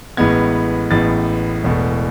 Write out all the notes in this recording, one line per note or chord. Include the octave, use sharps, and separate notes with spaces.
A1 A2 G#3 B3 G#6
A1 A2 G#3 B3 A6
E1 E2 B2 A3